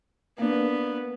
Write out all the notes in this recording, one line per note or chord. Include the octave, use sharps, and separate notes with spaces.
A#3 B3 D4